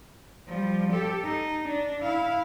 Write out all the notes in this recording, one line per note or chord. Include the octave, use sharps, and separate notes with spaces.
F3 G3
G4 A4
D#4
D4
E4 F5